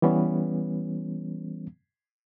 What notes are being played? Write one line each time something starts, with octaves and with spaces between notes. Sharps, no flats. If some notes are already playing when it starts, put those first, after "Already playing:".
E3 G3 B3 C#4